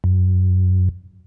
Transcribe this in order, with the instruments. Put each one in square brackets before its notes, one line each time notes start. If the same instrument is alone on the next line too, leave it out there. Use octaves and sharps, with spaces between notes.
[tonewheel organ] F#2